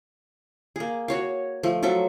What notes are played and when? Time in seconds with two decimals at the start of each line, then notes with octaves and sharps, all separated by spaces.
0.76 A#3 G#4
1.08 F#4 C#5 F5
1.63 F3 A3
1.83 F3 F#3 A4 E5